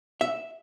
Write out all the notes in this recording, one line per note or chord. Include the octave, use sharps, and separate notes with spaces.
E5